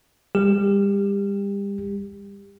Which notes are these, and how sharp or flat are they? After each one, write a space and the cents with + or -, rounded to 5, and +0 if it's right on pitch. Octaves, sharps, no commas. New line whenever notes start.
G3 +35 G4 +25